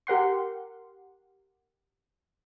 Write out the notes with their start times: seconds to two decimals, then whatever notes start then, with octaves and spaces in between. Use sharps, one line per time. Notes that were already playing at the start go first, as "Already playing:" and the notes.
0.07 G4 A#4 F#5 C6